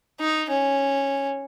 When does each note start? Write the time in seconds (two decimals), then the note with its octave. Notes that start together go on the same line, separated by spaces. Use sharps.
0.20 D#4
0.50 C#4